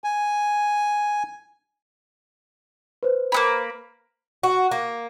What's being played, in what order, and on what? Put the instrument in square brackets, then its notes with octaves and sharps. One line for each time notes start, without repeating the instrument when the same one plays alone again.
[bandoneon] G#5
[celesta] B4 C5
[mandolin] A#3 B3 B5
[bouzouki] F#4
A#3